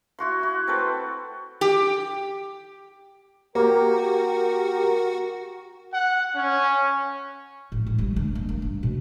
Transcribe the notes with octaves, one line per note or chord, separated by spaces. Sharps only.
E4 F#4 C6
F#4
C4 A4 B4
G4
A#3 F#4 G4 A#4
F#5
C#4
A1
A1
G3
D3
A#3
A#3
G2
B2